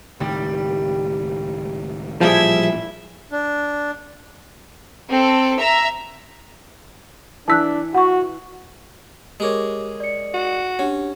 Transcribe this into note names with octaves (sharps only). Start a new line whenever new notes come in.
C#2 A2 D#3 G3
A1 A#2 F3 G3 E4 G#4 E5
D4
C4 A4
E5 A#5
E3 D4 A5 E6 F#6 B6
F#4 F#5 C#6
G#3 G4 A#4 C#5 D6
D5 C#7
F#4
C#4 D4 G4 F#5